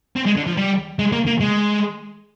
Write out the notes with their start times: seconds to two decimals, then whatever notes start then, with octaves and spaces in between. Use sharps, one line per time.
0.16 C4
0.26 G#3
0.36 D3
0.47 F3
0.57 G3
0.99 G#3
1.12 A#3
1.27 A#3
1.41 G#3